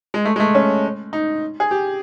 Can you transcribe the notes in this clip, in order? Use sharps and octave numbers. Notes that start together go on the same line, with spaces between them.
G#3
A3
G#3
A3
C#4
D#4
G#4
G4